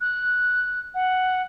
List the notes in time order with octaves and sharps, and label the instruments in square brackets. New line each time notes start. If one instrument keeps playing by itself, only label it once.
[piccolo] F#6
F#5